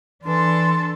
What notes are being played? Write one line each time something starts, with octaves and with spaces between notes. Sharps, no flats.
E3 D4 A4 C6